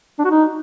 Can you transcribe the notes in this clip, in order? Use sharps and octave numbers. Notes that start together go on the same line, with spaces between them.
D4
F#4
D#4